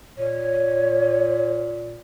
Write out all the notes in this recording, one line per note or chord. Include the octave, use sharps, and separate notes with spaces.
A#2 C#5